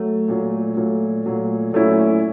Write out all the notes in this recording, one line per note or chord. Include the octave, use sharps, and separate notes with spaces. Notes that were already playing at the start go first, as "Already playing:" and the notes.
Already playing: F#3 A3
A#2 F#3 A3
A#2 F#3 A3
A#2 F#3 A3
A#2 F#3 A3 C#4 E4